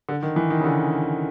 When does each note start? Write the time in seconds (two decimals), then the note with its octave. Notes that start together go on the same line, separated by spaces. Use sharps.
0.09 D3
0.23 D#3
0.36 E3
0.50 D#3
0.60 C#3
0.64 D3